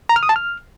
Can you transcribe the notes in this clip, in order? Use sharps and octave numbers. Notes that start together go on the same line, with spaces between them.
A#5
F6
D#6
A5
F6